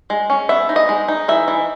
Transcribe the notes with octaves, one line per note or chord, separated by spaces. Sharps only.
G#3
C#4
B3 E5
D#4
D#5
G#3
D#4
E3 E5
E3